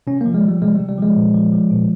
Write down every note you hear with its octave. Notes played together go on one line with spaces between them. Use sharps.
C3 C#4
A#3
F3
G#3
F3 G3
C3 G#3
C3 G3
G3
F3 G#3
A#2
F3
F3
A#2